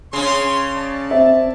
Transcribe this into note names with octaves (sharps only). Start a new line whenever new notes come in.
C#3 C#4 C6
D5 A5
C4 E5